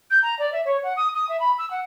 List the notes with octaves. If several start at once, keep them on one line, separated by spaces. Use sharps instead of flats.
G6
A#5
D5
E5
C#5
F#5
D#6
D#6
E5
B5
E6
F#5